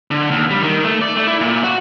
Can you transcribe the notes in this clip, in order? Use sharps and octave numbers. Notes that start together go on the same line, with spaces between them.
D3
D#2
G3
D#3
A3
D5
A3
E4
A#2
F#4